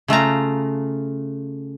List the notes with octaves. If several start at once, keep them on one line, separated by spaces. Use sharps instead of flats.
C#3 A3 F4 A#5